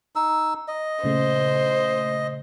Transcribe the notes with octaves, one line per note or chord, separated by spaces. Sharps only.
D#4 E6
D#5
A#2 C#3 A3 C5